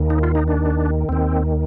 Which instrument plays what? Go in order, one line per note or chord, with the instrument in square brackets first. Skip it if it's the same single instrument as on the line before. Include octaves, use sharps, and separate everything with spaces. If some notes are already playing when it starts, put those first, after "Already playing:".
Already playing: [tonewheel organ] D#2 D#3
D#4
F4
D#4
D4
D#2 D#3 C4